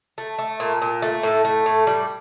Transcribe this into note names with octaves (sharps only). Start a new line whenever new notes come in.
A3
A3
A#2
A#2
A3
A2
A3
A2
G3